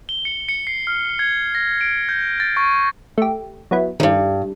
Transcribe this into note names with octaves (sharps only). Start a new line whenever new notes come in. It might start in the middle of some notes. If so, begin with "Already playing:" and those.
G7
C#7
C#7
C7
F6
G#6
A#6
D7
G6
A6
C#6
A3 G4
F#3 B3 E4
E2 G2 D#3